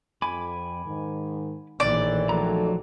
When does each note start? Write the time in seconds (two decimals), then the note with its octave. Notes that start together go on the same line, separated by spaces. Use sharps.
0.22 F2 G#5 B5 D6
0.85 G#2 D#3
1.80 A#1 A2 D#3 E3 D5
2.29 D#3 F3 F#3 A3 A4 A#5